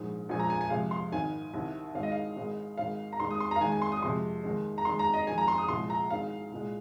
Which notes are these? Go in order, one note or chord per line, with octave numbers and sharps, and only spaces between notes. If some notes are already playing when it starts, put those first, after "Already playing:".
Already playing: A#1 G#2 G#3
A#1 A#2 F3 G#3 G#5
A#5
G#5
G#5
F2 C3 F3 G#3 F5
C6
G#1 G#2 D#3 G#5
C2 C3 D#3
G#1 G#2 D#3 G#3 F5
D#5
F5
G#1 G#2 G#3
G#1 G#2 G#3 F5
A#5
D#2 D#3 G#3 C6
D#6
C6
A#5
F5
D#2 D#3 G#3 G#5
G#5
C6
D#6
F2 C3 G#3 C6
D#2 D#3 G#3
A#5
D#2 D#3 G#3 C6
A#5
D#5
F2 D#3 G#3 G#5
A#5
C6
D#6
C2 A#2 F3 G#3 C6
A#5
G#1 G#2 G#3 F5
C2 A#2 G#3